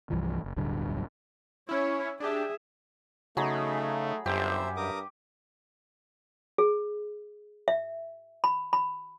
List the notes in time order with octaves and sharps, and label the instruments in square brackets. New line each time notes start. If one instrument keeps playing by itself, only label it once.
[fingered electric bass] C2 G2 E3 F3
F#1
D1 B1 G2 D3
[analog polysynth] C#4 E4 [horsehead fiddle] C#5
[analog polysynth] D4 G4 [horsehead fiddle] G#4 E5
[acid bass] C#3 [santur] F#3 G#4 B5 [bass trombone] A3 [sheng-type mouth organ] D#4
[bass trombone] G1 [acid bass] F#2 [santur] G4 [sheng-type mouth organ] C5 E5
[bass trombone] G2 [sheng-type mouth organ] A#4 D6 D#6
[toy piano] G#4
E5
B5
B5